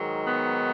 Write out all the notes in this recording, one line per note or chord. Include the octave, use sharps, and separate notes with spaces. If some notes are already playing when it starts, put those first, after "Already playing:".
Already playing: G#2 D#3 F#3
B3